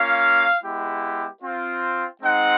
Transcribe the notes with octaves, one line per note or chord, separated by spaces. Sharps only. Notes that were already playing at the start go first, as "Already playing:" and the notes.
Already playing: A#3 C#4 F4 F5
G#3 B3 E4 G4
C4 F4
G#3 C4 D#4 F#5